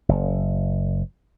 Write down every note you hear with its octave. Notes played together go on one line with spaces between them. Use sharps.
F#1